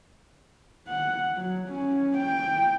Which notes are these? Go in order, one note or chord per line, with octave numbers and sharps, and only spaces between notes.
F#5
F#3
C#4
G5